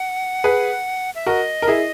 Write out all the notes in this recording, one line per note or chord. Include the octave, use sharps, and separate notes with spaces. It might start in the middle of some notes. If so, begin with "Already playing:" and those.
Already playing: F#5
G#4 B4
E5
F#4 A#4 D#5
A#4
E4 G#4